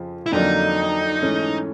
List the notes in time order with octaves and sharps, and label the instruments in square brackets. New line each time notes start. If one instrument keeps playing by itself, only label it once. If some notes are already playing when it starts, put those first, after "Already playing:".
Already playing: [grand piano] F2 C#3 F3
[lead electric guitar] E4
[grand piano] F2 D3 F#3 A#3 D4 [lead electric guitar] D#4
[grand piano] G#2 E3 A3 C#4